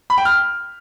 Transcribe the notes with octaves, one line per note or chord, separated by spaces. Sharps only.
B5
G5
F6